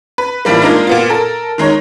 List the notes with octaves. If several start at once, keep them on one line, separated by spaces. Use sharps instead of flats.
B4
A2 E3 F3 G3 A#3
G#3 A#3 D4 D#4 F4
A#2 B3 F4
A4 A#4
D#3 G#3 D#4 C#5